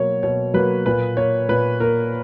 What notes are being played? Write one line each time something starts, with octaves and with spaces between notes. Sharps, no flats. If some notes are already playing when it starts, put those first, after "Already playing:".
Already playing: B2 F#3 A#3 C#5
B2 C#5
F#3 A#3 B4
A#2 B4
A#3 C#5
A#2 B4
A#3 A#4